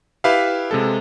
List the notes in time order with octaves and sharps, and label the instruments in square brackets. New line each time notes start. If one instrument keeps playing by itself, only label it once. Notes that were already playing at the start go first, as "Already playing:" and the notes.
[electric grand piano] E4 G4 B4 E5 F5
C3 G#3 A4